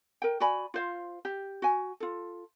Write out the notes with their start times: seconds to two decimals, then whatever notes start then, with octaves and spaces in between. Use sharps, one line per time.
0.22 A#4 G5
0.40 F#4 D5 G#5 B5
0.74 F4 C5 F5
1.25 G4
1.62 F#4 G#5
2.00 F4 A4